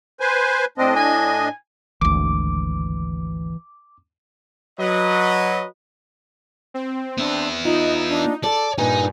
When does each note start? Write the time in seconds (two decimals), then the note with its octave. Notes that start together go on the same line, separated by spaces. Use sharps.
0.20 B4 C5 G#5
0.78 A2 C4 D4 D#5
0.96 G#5
2.01 G#1 D2 E3 D6
4.79 F#3 B4 D#5
6.74 C4
7.18 B3 D4 E4
7.65 D#4 F4 D#5
8.09 D4
8.44 A4 D5 A5
8.78 G2 A#2 D#4 B4 G#5